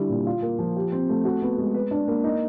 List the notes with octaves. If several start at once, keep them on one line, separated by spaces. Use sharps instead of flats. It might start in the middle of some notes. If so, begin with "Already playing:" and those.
Already playing: D3 G3 E4
A#2
F4
A#3
F3
G4
C4
A3
F#4
B3
G#3
B4
D4
A#3
D#4